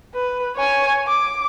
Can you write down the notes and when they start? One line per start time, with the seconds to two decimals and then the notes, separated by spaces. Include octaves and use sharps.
0.14 B4
0.56 C#5 G#5
1.08 D6